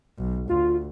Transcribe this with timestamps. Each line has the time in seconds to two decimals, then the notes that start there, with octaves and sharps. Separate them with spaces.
0.18 B1
0.49 D2 F4